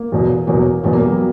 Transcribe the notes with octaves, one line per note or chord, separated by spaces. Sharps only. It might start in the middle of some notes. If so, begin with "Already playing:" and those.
Already playing: A#3
E2 B2 F#3
E2 B2 F#3 A#3
E2 B2 F#3 B3
A#3
G3
F#3